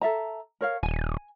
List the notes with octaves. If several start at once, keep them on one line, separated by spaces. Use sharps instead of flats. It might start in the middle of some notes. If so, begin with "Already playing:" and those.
A4 E5 A#5
A#4 C#5 F5
D#1 G#5